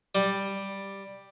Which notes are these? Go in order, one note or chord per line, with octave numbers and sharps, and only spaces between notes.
G3